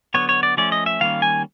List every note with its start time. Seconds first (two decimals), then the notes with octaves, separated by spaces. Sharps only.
0.14 D3 F#3 B3 C#5
0.29 C#5
0.43 D5
0.57 F3 A3 C#4 D5
0.72 D#5
0.86 E5
1.01 D#3 G3 A#3 C#4 F5
1.22 G#5